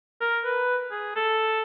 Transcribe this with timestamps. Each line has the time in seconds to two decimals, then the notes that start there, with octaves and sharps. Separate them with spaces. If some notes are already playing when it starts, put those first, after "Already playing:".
0.21 A#4
0.44 B4
0.91 G#4
1.16 A4